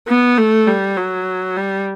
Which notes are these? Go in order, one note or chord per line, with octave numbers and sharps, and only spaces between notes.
B3
A3
G3
F#3
G3